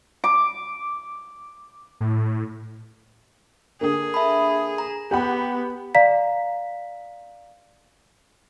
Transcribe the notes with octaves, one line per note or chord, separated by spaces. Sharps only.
D6
A2
D3 A#3 G#4
E5 A5 B5
A#5
B3 G4 F#5 B5
D5 F5 A#5 B6